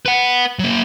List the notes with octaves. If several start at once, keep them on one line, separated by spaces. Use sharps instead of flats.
B4 F#5
F#3 A#3